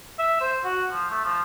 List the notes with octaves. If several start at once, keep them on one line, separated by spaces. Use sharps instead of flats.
E5
C5
F#4
F3
A3
F3